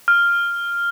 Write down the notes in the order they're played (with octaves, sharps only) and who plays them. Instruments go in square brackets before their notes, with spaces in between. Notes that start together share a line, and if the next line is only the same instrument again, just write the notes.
[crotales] F6